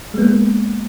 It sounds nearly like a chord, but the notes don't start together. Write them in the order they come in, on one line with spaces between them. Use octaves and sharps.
G#3 B3 A#3